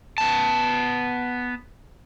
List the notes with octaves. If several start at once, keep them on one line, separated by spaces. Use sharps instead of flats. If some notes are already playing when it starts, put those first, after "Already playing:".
B3 A5